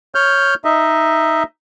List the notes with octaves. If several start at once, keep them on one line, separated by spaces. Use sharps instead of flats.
C#5 F6 G6
D#4 D#5 E5